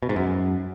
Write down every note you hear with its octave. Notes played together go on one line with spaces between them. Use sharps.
B2
G#2
F#2